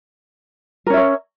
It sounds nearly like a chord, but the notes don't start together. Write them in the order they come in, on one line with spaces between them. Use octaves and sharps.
A#4 C#4 E5 C#5